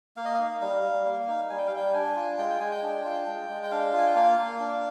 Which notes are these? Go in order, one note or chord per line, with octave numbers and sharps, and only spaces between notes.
A#3 F5
D#5
D#4 F5
G3 F5
G3
A#3
D#4
G3 G#5
G5
F5
G3 G5
D4 G#5
F4
G#3 G5
G5
G#3 G#5
G5
D4
F4
G#3
G#3
G5
D4 F5
F4 G#5
G5
A#3 F5
A#3
D4